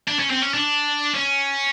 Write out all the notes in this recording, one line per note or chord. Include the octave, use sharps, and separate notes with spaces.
D4
C#4
C4
C#4
D4
C#4